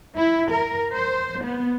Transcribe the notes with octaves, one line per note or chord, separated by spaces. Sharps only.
E4
A#4
C5
B3